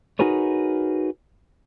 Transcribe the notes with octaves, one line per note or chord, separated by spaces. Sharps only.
D#4 F#4 G#4 A#4 B4 C#5